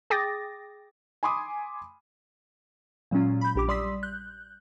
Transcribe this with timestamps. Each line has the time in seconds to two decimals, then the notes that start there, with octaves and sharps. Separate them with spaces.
0.10 G#4 G5 D6 D#6 A6 A#6
1.23 G#5 B5 C6 D6 D#6
3.11 A#2 F#3 G#3 C#4 F4
3.41 B5 G6
3.56 A#1 G4 D6
3.68 G3 D5 C6 D#6 E6 B6
4.03 F#6 G6